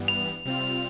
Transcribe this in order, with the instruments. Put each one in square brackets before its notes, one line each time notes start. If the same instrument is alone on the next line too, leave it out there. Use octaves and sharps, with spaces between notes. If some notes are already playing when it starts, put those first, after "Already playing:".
Already playing: [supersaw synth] G2 E3 G3 B3
[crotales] F7
[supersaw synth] C3 G3 C4 F4